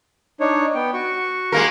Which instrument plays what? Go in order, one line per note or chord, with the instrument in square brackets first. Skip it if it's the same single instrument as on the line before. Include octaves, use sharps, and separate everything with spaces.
[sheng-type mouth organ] D4 D#4 C#5
B3 G5
F#4 C#6
[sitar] G#3 A#3 A#4